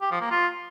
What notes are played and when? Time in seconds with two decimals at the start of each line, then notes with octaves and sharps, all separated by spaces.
0.02 G4
0.11 F3
0.21 A#3
0.31 F4